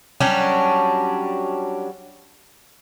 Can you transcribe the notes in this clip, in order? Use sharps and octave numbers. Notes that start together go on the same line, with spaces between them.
F#3 G3 C#4 D4